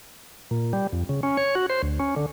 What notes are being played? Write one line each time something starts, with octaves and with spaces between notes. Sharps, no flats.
A#2
G3
F2
C#3
C#4
C#5
F#4
C5
D2
C#4
D3